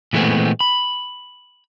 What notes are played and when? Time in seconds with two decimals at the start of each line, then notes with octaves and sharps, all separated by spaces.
0.13 A#2 E3 G#3 A3 B3 C4
0.61 B5